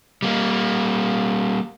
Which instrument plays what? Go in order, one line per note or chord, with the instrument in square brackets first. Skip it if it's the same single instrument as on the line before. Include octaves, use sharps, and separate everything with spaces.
[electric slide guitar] G3 A#3